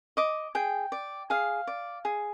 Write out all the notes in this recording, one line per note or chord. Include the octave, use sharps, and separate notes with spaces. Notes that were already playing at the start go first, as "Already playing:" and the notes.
D#5 D6
G#4 G5
D5
G#4 F5
D5
G#4